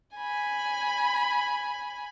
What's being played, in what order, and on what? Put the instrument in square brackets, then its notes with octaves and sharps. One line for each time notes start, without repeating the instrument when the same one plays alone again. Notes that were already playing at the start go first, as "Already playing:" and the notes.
[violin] G#5 B5